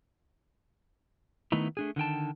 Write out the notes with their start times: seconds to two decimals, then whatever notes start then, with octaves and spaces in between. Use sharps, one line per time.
1.52 D#3 A3 B3 D#4 E4
1.77 A3 D4 G#4
1.96 D3 D#3 G5 A5